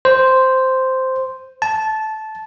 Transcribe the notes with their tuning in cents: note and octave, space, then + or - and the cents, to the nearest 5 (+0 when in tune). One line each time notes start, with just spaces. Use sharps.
C5 -5
A5 -15